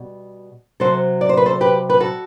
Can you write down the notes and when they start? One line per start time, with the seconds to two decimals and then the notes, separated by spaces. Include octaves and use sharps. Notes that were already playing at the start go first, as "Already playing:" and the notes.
Already playing: B2 G3
0.80 C3 F#3 A4 C5
1.21 D5
1.29 C5
1.37 B4
1.46 A4 C5
1.61 G4 B4
1.90 B4
2.00 F#4 A4